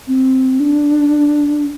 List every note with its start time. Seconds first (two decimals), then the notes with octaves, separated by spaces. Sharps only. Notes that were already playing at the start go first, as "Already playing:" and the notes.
0.08 C4
0.60 D4